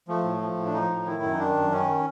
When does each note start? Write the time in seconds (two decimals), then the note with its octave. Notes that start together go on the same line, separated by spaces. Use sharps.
0.08 F3 A3
0.24 A2
0.41 F3
0.57 A2
0.65 D4
0.74 F3 D#4
0.90 A2
1.06 D#3 E4
1.22 F#2
1.33 D#4
1.39 D#3 D4
1.56 F#2
1.71 D#3 C#4